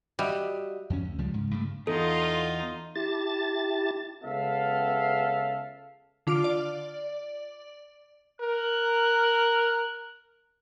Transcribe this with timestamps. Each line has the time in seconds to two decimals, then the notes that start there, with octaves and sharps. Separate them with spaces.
0.19 G3 F#4 D#5 E5
0.90 F2 C#4
1.05 D2
1.18 C#2 F3 G3 G#3
1.34 G#2 C#3
1.51 G2 C#3 A3
1.87 E2 D#4 F4 A4
2.95 E4 G4 A5 A6
4.24 C#2 C#3 B3 A4 E5 F5
6.27 D3 F4 D6 F6 D7
6.44 D5
8.41 A#4 F#6